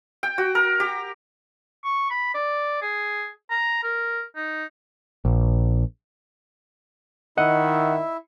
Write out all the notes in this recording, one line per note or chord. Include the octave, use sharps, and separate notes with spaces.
G5
F#4
A#4
G4
C#6
B5
D5
G#4
A#5
A#4
D#4
A#1
D#3 E4 D#5 E5 F#5